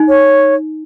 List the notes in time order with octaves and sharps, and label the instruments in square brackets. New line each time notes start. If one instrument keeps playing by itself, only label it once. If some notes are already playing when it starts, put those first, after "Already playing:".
Already playing: [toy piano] D#4
[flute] C#5